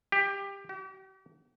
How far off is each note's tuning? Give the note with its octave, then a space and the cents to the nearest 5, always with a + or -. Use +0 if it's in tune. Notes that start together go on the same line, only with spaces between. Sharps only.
G4 +15
G4 -45